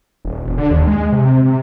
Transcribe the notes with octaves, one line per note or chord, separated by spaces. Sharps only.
D#1
E1
D3
D#2
G#3
C3
C3